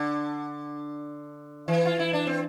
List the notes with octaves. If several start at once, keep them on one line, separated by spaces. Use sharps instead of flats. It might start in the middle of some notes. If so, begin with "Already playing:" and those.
Already playing: D3
E3
F4
E4
D4
C4